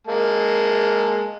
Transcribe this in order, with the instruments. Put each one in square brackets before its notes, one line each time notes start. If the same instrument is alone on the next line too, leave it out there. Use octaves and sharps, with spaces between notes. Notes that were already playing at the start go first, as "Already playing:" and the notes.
[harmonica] G#3 A#3 A5